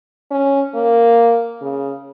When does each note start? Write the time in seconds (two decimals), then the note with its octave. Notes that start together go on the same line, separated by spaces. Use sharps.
0.31 C#4
0.75 A#3
1.62 C#3